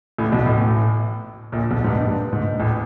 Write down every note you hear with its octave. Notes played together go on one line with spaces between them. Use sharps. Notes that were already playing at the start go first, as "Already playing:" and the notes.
A1 A2
B1 B2
A1 A2
A#1 A#2
B1 B2
G#2
G2
G2
G#2
A1 A2